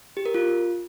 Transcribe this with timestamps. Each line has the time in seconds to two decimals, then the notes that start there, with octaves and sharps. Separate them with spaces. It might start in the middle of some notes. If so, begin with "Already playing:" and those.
0.17 G4
0.26 A#4
0.34 F4